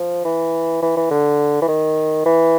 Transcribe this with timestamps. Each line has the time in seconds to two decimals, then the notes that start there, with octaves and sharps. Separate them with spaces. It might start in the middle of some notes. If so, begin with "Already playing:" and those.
Already playing: F3
0.25 E3
0.82 E3
0.97 E3
1.11 D3
1.62 E3
1.68 D#3
2.26 E3